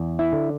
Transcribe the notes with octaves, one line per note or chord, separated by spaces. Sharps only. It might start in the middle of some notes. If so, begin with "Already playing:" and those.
Already playing: E2
E4
D3